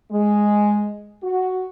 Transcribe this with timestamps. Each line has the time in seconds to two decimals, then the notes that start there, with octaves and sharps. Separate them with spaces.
0.11 G#3
1.23 F#4